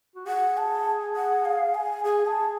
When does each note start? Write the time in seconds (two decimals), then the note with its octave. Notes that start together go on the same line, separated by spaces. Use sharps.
0.16 F#4
0.27 G#4 F#5
0.57 A5
1.16 F#5
1.45 F5
1.75 G#5
2.04 G#4 G#5
2.26 G#4 A5